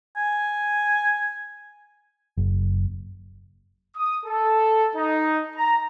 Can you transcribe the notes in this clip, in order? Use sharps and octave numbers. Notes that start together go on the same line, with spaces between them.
G#5
F#1
D#6
A4
D#4
A#5